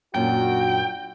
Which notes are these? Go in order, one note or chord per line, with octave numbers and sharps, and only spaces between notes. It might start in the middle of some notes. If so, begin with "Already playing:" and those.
F#2 A#2 D4 F#4 G5